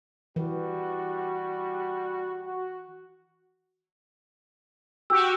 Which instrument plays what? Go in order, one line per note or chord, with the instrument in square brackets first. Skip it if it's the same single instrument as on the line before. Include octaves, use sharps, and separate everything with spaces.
[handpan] E3 [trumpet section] G3 F#4
[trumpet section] F#4
[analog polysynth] F#4 G4 [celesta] E6